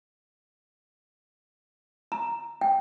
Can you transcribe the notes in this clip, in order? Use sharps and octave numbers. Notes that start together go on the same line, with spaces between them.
A#5
G5